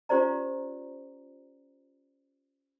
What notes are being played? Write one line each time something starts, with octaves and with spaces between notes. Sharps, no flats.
C#4 F4 G4 C5 D5 A#5